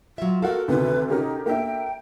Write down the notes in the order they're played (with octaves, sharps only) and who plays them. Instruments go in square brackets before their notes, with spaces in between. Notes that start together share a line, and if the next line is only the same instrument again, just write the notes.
[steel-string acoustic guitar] F#3 E5 [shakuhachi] F4
[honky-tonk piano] F4 F#5 [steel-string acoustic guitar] F#4 A4 [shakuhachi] A#4
[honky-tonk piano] D2 C3 D#3 [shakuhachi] B4
[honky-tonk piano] C#4 G4 A#4 [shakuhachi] D#4
[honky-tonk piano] A#3 D4 E5 [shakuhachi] G5